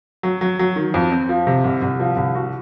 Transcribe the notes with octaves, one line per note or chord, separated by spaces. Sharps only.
F#3
F#3
F#3
D#3
F2
C4
F3
C3
C2
C2
F3
C2
F#4